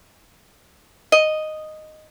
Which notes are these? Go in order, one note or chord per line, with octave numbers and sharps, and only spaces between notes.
D#5